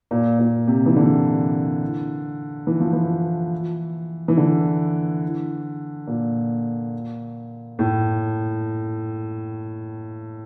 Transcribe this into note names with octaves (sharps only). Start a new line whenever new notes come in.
A#2
A#2
C3
E3
D3
E3
F3
E3
E3
D3
A#2
A2